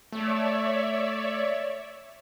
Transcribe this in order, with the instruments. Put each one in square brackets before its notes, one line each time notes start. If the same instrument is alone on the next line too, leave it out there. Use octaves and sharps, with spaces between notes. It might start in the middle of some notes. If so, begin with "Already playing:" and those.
[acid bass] A3 [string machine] C#5 D5 E5